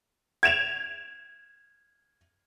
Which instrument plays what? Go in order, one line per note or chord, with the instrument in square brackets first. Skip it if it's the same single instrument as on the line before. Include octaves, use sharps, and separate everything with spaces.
[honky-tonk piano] G#6 D7 E7 F7